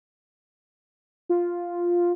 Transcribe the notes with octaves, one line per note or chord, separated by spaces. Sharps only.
F4